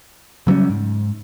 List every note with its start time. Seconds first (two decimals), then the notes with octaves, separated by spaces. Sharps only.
0.47 C#3 F#3 G3 C#4
0.69 G#2